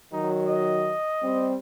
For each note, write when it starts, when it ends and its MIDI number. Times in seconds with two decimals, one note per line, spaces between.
0.13 0.94 51
0.13 0.94 54
0.13 0.34 63
0.48 1.50 75
1.22 1.55 55
1.22 1.55 60